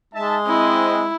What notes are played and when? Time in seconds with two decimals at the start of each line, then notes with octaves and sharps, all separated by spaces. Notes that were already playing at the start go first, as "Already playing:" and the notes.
0.13 G#3 D#4 E5 A5
0.47 C4 E4 D#5